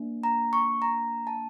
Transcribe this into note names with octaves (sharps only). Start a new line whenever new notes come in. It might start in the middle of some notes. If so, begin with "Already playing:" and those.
Already playing: A#3 D4
A#5
C#6
A#5
A5